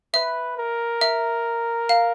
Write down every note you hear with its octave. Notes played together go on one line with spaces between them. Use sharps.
B4 E5
A#4
E5
F5